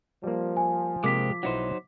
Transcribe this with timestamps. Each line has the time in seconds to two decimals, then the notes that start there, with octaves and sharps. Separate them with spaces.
0.24 F3 G3 A#3
0.57 G#5
1.04 C3 G#3 A#3 G4 D6 B6
1.43 B1 F#3 D#4 E4 C5 F#5